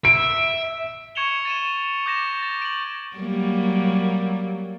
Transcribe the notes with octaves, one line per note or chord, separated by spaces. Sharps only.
E5 D7
C#6 G#6 C#7 E7 F7 G7
A6 D#7 E7
D6 G6 A#6 E7
A6
D7 F#7
F#3 G3 A#3